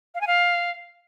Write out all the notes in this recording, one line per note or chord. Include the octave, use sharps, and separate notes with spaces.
F5
G#5
F5